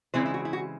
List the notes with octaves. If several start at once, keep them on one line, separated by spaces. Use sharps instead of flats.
C#3 E3 G#3 C4 E4 C5
E4
F#4
E4
F#4